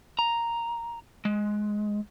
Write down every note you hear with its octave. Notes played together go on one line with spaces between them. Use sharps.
A#5
G#3